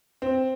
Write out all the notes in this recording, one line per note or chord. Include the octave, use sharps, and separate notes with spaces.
C4